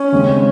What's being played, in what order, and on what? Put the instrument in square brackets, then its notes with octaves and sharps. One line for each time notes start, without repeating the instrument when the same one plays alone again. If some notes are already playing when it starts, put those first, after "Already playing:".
Already playing: [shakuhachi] C#4
[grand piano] D#2 C#3 G#3 C4